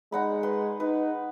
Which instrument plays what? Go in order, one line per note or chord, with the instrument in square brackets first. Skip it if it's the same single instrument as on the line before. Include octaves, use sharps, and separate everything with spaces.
[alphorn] G#3 [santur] D#4 F#5 B5
[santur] B4 C6
[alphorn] D#4 [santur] B4